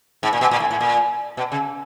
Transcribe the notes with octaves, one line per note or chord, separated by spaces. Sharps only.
G#2
A#2
B2
A#2
A2
A2
A#2
B2
C#3